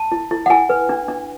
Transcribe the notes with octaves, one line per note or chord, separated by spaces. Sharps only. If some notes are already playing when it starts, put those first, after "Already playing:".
Already playing: A5
E4
E4
F#5
E4 G#5
B4
D4
D4